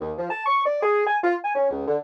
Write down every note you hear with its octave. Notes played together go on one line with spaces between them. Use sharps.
D#2
F3
A5
C#6
D5
G#4
G#5
F4
G#5
C#4
C#2
D3